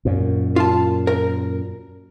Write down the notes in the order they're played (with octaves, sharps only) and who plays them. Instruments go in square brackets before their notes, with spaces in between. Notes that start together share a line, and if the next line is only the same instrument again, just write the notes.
[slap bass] F#2 A#2
[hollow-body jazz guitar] F4 A5
A#4